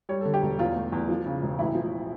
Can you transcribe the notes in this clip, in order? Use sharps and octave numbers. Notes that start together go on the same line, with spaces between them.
G3 C#5
D3 A4
G4
E1
E2 F4
A3
E2
F3
C#3
E1
A1 E4
F3